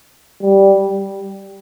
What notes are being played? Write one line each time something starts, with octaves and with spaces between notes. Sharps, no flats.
G3